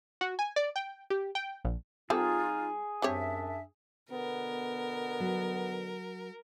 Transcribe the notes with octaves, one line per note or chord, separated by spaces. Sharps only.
F#4
G#5
D5
G5
G4
G5
A#1
G3 C4 D#4 F4 G#4 A4
F#2 G3 C4 D4 C#5 E5
B2 D3 B3 A#4
F#3